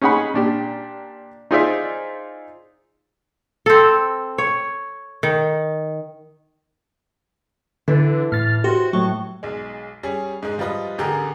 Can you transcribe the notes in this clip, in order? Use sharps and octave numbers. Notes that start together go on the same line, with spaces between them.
C#4 D#4 G#4 F#5 B5
A#2 D4 G4
D#4 F4 G#4 C5 D5 E5
C4 A4
C#5
D#3
D3 E3
A2 F6 A6
F#4 G4 C5
A2 F#3 C#6
B1 G#3
G3 C#4 G#4
G#2 G#3
F3 G3 F4 B4 D#5
A1 D3 G4 G#4 A#4 A#5